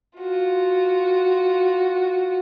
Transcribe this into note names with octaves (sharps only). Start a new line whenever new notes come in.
F4 F#4